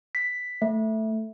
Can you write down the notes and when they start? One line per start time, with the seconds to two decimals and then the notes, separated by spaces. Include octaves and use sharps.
0.15 B6
0.62 A3